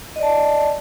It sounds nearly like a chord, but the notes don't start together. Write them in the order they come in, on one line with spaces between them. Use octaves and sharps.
D#5 D5 A5